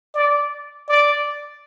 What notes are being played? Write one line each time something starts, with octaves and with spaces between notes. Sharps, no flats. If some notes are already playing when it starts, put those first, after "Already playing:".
D5
D5